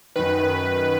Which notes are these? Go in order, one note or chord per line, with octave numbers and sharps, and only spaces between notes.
F#2 D#3 B4